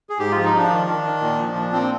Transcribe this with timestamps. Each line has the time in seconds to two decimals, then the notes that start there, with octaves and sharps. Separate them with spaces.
0.09 G#4
0.19 G#2 G4
0.31 F3 F4
0.44 D#4
0.53 F3 D4
0.70 D#3
0.87 D#3
1.04 D#3
1.21 A#2
1.38 F3
1.55 A#2
1.73 A#2 C4